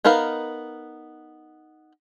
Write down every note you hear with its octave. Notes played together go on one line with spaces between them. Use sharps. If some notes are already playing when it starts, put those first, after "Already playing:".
B3 D#4 A#4 B4 F5